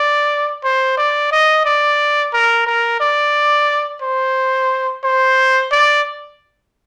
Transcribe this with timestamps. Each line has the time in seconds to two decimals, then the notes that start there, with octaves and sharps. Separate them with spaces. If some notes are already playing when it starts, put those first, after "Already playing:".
Already playing: D5
0.64 C5
0.98 D5
1.32 D#5
1.65 D5
2.33 A#4
2.67 A#4
3.00 D5
4.02 C5
5.04 C5
5.71 D5